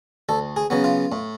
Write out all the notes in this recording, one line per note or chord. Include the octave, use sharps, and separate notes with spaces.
D2 A4
G#4
C#3 F#3 B3
F4
A2